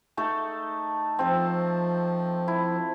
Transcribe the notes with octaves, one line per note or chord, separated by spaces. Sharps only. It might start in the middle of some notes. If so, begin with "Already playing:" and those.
A3 D#4 A4
F3 C4 A4
E4